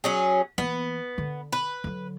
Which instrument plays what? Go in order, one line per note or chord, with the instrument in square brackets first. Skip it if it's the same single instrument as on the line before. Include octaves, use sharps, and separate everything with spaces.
[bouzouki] F#3 C#4 G#4
[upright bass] E3 A#3 [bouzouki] B3
[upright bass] D3
[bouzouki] B4
[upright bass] D3 F#3